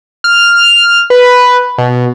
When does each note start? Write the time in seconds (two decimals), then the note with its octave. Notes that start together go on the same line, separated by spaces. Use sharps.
0.24 F6
1.10 B4
1.78 B2